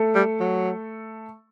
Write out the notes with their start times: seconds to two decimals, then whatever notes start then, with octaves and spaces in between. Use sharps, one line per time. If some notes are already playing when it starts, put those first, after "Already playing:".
Already playing: A3 A4
0.15 G3
0.40 F#3